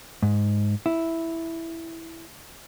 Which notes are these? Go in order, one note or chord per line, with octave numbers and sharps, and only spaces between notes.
G#2
E4